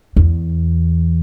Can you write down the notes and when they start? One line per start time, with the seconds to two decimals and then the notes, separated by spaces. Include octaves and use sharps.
0.16 E2